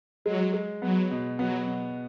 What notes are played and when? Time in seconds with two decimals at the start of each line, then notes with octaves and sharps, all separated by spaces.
0.25 F#3 G#3
0.54 G#3
0.82 F#3 B3
1.11 B2
1.39 F#3 B3
1.67 B2